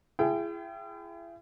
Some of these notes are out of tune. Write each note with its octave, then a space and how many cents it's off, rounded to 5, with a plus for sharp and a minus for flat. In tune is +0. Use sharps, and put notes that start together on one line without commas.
E4 +40 G#4 +0 G5 -15